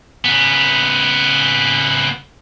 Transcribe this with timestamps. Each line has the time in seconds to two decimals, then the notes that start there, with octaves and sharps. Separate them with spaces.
0.25 C#3 B3